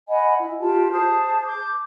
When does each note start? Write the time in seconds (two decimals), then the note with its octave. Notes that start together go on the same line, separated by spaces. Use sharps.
0.08 D#5 F#5 G#5 B5
0.37 E4
0.59 F4 G4 A5
0.91 G#4 C5 A5
1.44 D6 G6